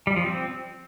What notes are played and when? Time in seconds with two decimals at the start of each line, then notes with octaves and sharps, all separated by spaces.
0.07 G3
0.16 F3
0.26 C4